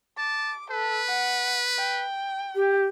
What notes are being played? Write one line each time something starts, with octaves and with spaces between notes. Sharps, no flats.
A5 D6
A4 B4
F#5
G5
G4